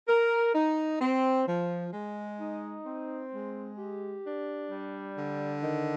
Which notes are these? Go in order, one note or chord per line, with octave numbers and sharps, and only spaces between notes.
A#4
D#4
C4
F3
G#3
D#4
C4
G#3
G4
D4
G3
D3
D#3